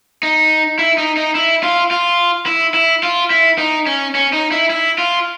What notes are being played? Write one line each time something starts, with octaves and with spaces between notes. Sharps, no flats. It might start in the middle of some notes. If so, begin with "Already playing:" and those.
D#4
E4
D#4
D#4
E4
F4
F4
E4
E4
F4
E4
D#4
C#4
C#4
D#4
E4
E4
F4